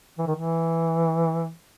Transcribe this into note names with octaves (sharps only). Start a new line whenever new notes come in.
E3
D#3
E3